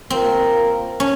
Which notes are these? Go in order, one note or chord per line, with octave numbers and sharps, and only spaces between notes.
A#3 C4 F4 A#4
C#4